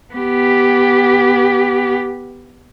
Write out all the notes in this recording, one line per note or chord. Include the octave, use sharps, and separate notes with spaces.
B3 G4